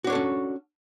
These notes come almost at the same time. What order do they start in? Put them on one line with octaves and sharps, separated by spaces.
F#4 D4 C#5 A4 C#4